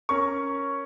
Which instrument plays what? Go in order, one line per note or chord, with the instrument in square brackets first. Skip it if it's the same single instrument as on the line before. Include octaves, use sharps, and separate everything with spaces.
[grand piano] C#4 A#4 C#6